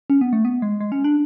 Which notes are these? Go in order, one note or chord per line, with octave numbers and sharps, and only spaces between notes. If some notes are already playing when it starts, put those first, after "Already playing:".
C#4
B3
A3
B3
G#3
G#3
C#4
D4